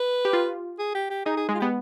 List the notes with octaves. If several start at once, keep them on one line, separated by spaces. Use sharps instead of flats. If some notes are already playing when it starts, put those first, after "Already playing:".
Already playing: B4
G4
F4
G#4
G4
G4
D#4 G#4
G#4
G#3 G#4
F4
B3 G4